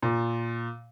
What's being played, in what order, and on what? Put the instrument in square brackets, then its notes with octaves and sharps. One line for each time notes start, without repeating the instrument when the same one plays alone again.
[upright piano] A#2